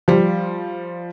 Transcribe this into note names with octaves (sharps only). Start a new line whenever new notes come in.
F3 G3